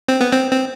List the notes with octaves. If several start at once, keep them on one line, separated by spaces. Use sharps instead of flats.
C4
B3
C4
C4